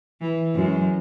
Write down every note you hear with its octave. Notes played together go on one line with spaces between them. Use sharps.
E3
F#2 G#3